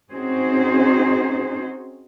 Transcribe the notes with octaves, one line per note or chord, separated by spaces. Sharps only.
C4 C#4 D#4 F#4 G#4 C5